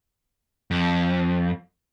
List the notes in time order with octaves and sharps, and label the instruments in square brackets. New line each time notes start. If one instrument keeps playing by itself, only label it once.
[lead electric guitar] F2